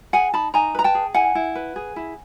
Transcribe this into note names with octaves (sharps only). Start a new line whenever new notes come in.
G#4 F#5 G#5
D#4 A5 B5
D#4 G#5 A#5
B4 A#5
G5 A5
G#4
E4 F#5 G#5
E4
B4
G#4
E4